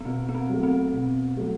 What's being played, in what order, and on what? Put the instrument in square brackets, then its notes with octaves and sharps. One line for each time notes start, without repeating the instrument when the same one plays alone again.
[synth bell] B3
[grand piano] B2 [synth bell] C4
[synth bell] B3
C4
[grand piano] F#3 A3
[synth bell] C4
[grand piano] B2
F#3 A3